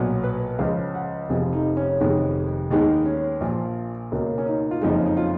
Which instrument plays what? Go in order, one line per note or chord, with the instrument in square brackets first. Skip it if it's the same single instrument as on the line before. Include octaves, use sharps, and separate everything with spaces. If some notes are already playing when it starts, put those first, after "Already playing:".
Already playing: [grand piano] B1 A#2 F#3 B3
B4
C#2 C#3 F3 G#3 F5
F#5
F1 F2 F3 B3 G#4
D#4
C#4
F1 F2 D#3 G#3 B3
D#2 D#3 G#3 B3 D#4
C#4
A#1 A#2 F3 F4
C#2 B2 A#3 C#4
C#4
D#4
F4
F#1 F2 C#3 F3 G#3 D#4
D#4
F4